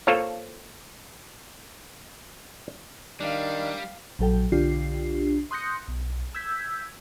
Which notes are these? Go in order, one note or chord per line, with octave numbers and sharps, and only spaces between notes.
A#3 F4 A4 C5 C#5
D#3 G3 D4 F5
A#1 F#3 A4 G5
B1 D3 D4 F4 G4 C7
C6 D#6 F#6 G6 A#6 C#7
B1
E6 G6 G#6 B6